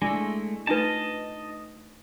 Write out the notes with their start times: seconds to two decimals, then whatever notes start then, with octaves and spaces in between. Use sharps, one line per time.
0.02 G#3 A3 D4 E4 G#5
0.67 A3 D4 D#4 F4 B4 D#5 A5